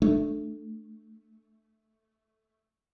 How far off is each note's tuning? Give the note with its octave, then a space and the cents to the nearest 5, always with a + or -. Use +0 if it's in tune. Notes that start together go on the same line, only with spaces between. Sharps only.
A3 -5 D4 +25